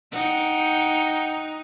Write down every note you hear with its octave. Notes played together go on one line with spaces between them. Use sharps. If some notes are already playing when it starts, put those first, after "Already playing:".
D#4 F#5 G5